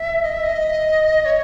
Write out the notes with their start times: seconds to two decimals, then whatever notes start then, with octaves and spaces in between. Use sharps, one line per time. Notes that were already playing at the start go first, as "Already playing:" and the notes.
Already playing: E5
0.23 D#5
0.33 E5
0.44 D#5
1.25 C#5